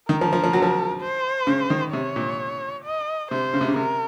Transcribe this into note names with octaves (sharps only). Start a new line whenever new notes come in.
D#3 A#4
F3
F3
F3
F#3
F3
C5
C#3
D#3
C3 C#5
A#2
D#5
C3 C5
C#3
C3
C#3
C3 A#4